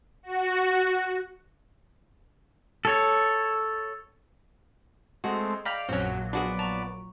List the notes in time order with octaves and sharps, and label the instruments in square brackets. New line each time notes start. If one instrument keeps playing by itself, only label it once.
[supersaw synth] F#4
[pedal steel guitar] A4 C#5
[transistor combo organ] G#3 A3 C4 [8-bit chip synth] F#4 [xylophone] G#4 D#5
[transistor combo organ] D5 F5 [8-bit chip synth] G5 A#5 B5 [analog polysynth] F6
[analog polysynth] A#1 A#2 F#3 [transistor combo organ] F#2 [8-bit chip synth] C4 C#4 [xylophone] F#5 F#6
[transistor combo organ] B3 D5 [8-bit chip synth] D4 F#4 G#4
[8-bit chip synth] A5 [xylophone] A#5 C#6